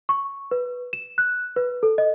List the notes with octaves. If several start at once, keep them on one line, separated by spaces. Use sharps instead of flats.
C#6
B4
E7
F#6
B4
A4
D#5